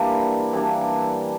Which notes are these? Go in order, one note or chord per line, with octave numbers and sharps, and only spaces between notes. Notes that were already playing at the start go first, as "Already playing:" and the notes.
Already playing: E3 G3 A#3 D4
E3 G3 A#3 D4